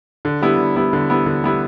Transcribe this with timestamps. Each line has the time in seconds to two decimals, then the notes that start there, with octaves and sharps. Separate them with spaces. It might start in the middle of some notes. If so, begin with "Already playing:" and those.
0.25 D3
0.42 G3 B3 E4
0.59 D3
0.76 G3 B3 E4
0.93 D3
1.10 G3 B3 E4
1.26 D3
1.44 G3 B3 E4